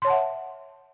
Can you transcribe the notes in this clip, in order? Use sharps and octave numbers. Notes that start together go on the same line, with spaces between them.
C#5 E5 F#5 A5 C6